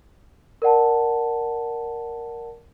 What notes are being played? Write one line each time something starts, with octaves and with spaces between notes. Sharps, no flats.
A#4 D5 F#5 A5